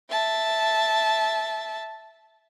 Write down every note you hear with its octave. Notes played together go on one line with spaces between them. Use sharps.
E5 A5